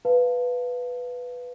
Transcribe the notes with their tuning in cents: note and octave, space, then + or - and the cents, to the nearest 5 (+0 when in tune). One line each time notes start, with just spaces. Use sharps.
B4 +0 F5 +0 A5 +10